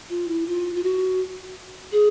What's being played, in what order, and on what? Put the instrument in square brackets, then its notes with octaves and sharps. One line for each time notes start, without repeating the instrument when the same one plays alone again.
[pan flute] F4
E4
F4
F4
F#4
G#4